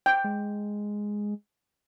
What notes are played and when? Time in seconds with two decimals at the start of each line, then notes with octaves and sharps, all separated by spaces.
0.06 G5
0.24 G#3